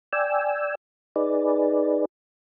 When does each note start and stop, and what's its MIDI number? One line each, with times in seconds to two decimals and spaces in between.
0.13 0.75 74
0.13 0.75 79
0.13 0.75 80
0.13 0.75 88
1.16 2.05 63
1.16 2.05 68
1.16 2.05 71
1.16 2.05 74